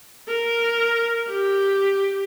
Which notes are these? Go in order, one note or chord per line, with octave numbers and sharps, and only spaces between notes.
A#4
G4